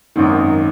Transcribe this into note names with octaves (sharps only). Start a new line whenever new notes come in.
G#1 F#2 D#3